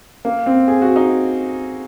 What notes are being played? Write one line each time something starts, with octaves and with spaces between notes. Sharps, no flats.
A#3
C4
G#4
F#4
D#4